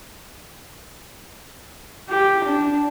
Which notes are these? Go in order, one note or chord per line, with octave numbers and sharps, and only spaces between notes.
G4
D4